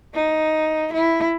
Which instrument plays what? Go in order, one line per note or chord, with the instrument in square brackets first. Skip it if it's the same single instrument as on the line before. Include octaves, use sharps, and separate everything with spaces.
[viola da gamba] D#4
E4